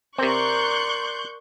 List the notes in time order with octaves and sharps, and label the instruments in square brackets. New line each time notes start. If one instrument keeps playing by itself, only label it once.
[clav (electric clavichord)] C3 C4 [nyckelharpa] A#4 [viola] D5 C6 [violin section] C#6 F#6 G6